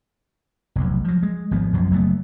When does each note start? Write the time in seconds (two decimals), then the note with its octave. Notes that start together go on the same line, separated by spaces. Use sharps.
0.76 F1 B1 E2
1.05 F3 F#3
1.23 G#3
1.51 G#1 F3 B3
1.73 B1 F#2 F3
1.91 F#1 F#3 A3 B3